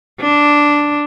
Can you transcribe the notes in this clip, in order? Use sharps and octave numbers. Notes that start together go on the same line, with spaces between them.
D4